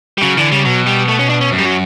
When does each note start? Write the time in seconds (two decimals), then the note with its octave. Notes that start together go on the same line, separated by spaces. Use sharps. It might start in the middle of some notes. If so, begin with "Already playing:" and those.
0.18 G3
0.22 C#3 F#3
0.37 D3 E3
0.52 C#3 G3
0.65 B2 F#3
0.87 G3
1.08 A3
1.19 C#4
1.29 D4
1.41 C#4
1.52 F#2
1.59 G3
1.65 F#3